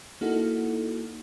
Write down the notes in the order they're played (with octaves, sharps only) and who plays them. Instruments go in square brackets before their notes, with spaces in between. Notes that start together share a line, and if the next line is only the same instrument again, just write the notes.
[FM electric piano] A#3 D#4 E4 F#4 A4 F#5